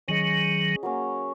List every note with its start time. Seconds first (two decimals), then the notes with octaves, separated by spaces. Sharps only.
0.08 D#3 F#3 C#4 G#4 D#5
0.83 F#3 A#3 C#4